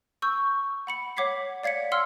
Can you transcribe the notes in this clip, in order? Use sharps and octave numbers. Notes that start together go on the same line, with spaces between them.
C#6 E6 G6
F#5 B5 C#7
C#5 F#5 D6 G#6 B6 C7
D5 F5 G#6 B6 C#7
F5 F#5 C6 E6 F6